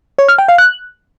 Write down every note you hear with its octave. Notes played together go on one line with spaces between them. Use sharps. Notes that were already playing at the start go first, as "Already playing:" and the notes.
C#5
F6
G5
F5
F#6